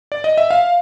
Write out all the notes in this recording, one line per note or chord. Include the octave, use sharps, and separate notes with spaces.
D5
D#5
E5
F5